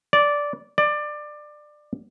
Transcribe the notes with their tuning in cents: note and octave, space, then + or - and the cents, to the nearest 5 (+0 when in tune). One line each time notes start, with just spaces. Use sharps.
D5 -10
D5 +20